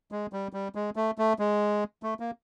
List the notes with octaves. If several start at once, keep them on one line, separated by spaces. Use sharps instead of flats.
G#3
G3
G3
G#3
A3
A3
G#3
A3
A#3